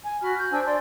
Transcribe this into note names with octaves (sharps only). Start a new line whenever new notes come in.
G#5
F#4 B5 F6
G6
D4 C5 G#5 E6
D5 C6